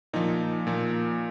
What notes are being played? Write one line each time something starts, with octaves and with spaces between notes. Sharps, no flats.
A#2 F3 D#4
A#2 F3